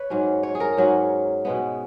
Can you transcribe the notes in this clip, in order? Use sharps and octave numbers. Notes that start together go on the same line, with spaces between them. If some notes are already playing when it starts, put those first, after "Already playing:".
Already playing: B4 C#5
G#2 F#3 C#4
C#5
G#4
A#4
G#2 F#3 C#4
B2 G#3 B3